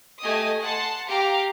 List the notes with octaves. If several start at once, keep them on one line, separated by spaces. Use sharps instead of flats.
A3 G4 D#5 G#5 D#6
F#5 A5 C6
G4 F5 A#5 D6